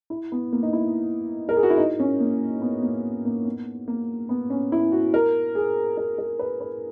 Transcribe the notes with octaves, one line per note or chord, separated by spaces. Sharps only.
E4
B3
A#3
D#4
E4
A#4
G#4
F#4
E4
D#4
C#4
A#3
B3
A#3
A#3
B3
A#3
B3
C#4
E4
F#4
A#4
G#4
A#4
A#4
B4
B4